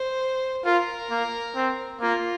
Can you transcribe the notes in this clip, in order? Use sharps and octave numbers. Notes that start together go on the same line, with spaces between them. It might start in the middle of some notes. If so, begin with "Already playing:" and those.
Already playing: C5
F4 A#4
A#3
C4
A#3 F4